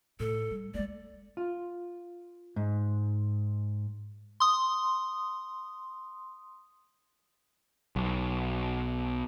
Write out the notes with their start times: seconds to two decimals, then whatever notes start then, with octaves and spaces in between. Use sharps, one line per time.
0.20 A2 A4
0.51 G3
0.74 G#3 A#3 D5
1.37 F4
2.56 G#2
4.40 C6 D#6
7.96 B1